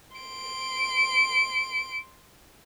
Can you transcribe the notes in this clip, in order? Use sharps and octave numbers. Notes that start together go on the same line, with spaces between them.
C6 D7